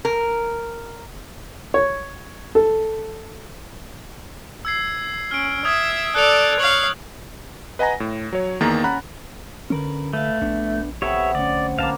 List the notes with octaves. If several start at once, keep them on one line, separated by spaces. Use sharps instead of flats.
A#4
C#5
A4
E6 G#6 C7
C#4 F6 D7
E5 D#6 G#6
A4 D5 F#6 F7
C#5 F5 F#7
B4 D#5 F#5 G#5 A#5 A#6
A2
F#3 C#5
E2 D#3 A#3 G#4 A#5 A6
C#4 F#5 A#5 B5 F#6
D3 C#4 A#4 B4
A3 B4 F5
A#1 B3 D4
C3 B3 G4 A4 B4 C#5 E5
D2 C#4 D5
A#1 A#3 B4 F5 A5